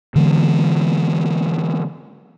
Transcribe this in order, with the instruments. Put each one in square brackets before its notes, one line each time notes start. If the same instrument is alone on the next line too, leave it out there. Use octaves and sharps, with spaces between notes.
[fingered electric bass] D3 E3 G#3 B3